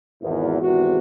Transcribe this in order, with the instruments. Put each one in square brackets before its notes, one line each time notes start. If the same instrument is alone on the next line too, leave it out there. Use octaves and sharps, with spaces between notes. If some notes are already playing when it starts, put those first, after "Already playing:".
[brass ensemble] G#1 E2
G#1 E2 C3 F#4